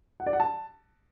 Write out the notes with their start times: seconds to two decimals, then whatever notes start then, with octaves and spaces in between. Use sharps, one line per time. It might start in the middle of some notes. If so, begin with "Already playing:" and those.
0.20 F#5
0.26 D5
0.33 F#5
0.40 A5